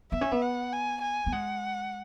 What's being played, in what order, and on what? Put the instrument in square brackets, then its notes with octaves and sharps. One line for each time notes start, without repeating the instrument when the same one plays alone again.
[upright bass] B3 [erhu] E5
[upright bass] C#4
B3
[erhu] F#5
G#5
G#5
[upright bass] B3
[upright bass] G#3 [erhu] F#5